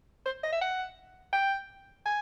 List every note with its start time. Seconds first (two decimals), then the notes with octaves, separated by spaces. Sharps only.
0.26 C5
0.44 D#5
0.52 E5
0.61 F#5
1.33 G5
2.06 G#5